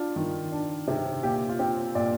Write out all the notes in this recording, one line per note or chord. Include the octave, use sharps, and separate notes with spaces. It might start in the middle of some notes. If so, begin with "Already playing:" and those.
Already playing: D4 F4
D#3
D4
C3
A#2 G4
F4
C4 G4
A#2 D5